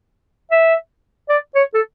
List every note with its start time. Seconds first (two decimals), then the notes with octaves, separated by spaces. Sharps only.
0.51 E5
1.29 D5
1.55 C#5
1.74 A4